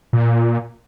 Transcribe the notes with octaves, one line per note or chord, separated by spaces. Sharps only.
A#2